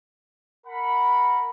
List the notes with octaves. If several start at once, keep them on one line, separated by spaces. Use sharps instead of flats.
A#4 F#5 B5